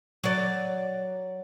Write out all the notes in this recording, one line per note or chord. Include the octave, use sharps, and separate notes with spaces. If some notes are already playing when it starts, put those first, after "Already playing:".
F#3 D5